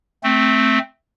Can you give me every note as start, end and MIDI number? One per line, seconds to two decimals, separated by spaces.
0.23 0.79 57
0.23 0.79 60